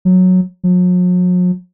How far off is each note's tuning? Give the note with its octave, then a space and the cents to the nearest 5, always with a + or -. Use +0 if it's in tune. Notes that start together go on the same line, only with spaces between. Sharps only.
F#3 -10
F#3 -45